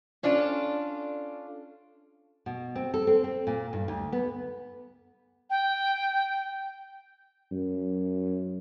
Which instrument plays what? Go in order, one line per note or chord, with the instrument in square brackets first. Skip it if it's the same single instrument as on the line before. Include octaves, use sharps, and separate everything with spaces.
[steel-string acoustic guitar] C#4 D4 F4 A4 D5
[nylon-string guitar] B2
C4
A4
C4
C4
A#2
G2
D2
B3
[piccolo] G5
[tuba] F#2